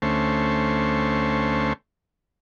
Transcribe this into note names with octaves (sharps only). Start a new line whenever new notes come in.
D2 A3 C#4 C5